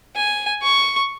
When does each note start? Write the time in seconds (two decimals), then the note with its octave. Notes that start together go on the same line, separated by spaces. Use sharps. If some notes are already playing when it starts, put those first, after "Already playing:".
0.16 G#5
0.63 C#6